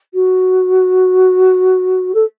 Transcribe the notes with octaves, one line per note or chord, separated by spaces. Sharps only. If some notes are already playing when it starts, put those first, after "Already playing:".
F#4
A4